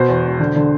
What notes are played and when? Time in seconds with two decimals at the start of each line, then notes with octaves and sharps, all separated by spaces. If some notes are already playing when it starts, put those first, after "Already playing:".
Already playing: B2 C5
0.08 E2
0.24 E1
0.39 D3
0.56 D3